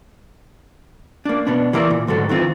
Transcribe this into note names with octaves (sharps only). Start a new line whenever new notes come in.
A#3 D4
B2 B3 D4
E3 A#3 E4 D5
A#2
D2 G#2 F#3 A4
D#3 E3 C4 F4